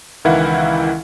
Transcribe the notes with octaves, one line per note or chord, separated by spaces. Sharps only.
C#2 D#3 E3 E4 F5 F#5